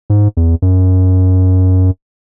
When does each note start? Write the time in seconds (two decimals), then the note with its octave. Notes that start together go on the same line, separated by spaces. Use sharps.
0.10 G#2
0.37 E2
0.62 F#2